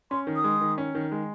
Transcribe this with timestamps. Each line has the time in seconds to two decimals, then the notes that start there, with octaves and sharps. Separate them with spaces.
0.11 C#4 C6
0.27 D#3
0.36 D#6
0.44 G#3
0.61 D#3
0.78 C#4
0.95 D#3
1.12 G#3